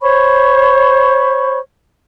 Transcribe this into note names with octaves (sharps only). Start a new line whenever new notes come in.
C5 C#5 B5 C#6